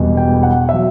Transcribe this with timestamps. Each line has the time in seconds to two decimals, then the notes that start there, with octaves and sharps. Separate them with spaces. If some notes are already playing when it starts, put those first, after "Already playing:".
Already playing: E1 E2 B2 G3
0.17 G5
0.43 F#5
0.69 F#3 E5